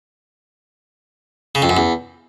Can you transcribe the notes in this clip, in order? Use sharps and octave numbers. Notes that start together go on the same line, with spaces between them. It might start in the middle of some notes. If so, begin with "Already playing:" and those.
C#3
F2
F#2
E2